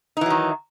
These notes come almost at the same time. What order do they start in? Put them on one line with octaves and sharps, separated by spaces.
D#4 E3 F#3 D#3